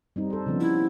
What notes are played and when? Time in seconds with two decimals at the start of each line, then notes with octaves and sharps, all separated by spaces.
0.16 G3 C4 D#4
0.30 A4 C5
0.46 C#3 F3 B3
0.61 E4